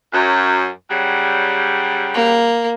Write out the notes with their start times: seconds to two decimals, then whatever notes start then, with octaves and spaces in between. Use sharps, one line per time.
0.13 F#2
0.91 C#3 F#3 G3
2.14 A#3